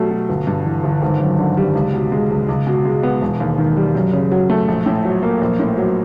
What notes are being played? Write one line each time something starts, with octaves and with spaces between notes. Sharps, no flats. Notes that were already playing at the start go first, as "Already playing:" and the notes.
Already playing: B2 F#3 G3 A3
B2
G1
G2
E3
G1
G#1
F#2
D3
G3
C#2
B2
G#3
C#2
C#2
B2
G#3
B3
E1
D#2
D#3
G3
F#2
C#3
F#3
A3
A#1
A2
F#3
A#3
A#1
A2
F#3